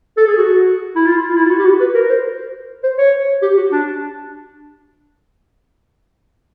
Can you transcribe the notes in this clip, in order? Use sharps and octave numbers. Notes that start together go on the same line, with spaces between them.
A4
G#4
F#4
E4
F4
F4
E4
F4
F#4
G4
F#4
B4
A#4
C5
C5
C#5
G4
F#4
D4